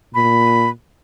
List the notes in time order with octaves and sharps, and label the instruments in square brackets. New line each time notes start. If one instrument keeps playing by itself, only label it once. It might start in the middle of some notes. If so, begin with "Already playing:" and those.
[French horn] A#2 [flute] B5